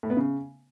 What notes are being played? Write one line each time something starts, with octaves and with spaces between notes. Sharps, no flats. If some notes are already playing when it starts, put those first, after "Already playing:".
A2
B3
C#3